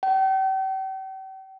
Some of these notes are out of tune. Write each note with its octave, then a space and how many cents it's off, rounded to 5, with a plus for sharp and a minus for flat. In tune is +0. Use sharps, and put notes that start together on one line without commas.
G5 -40